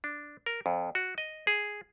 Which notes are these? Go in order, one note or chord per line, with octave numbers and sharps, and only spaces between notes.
D4
A#4
F2
F#4
D#5
G#4